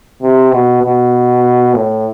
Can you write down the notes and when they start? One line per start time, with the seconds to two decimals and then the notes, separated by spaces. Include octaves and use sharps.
0.22 C3
0.52 B2
0.83 B2
1.74 A2